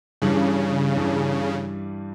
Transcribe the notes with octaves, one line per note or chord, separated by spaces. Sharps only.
G2 C#3 E3 G3
G2 E3 G3